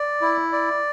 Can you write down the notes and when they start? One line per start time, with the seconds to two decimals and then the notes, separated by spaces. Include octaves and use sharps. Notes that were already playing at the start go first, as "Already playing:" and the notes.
Already playing: D5
0.21 E4
0.52 D5